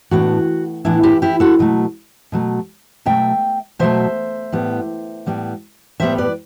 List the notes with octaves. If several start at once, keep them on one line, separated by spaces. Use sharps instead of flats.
A2 E3 B3 D4 F#4
A2 E3 B3 D4 E4
E4 G4
E4 G4
F#4 A4
B2 F#3 A3
B2 F#3 A3
B2 F#3 A3 E5 G5
B2 F#3 A3 C5 E5
A2 G3 B3
A2 G3 B3
A2 G3 B3 C5 E5
B4 D5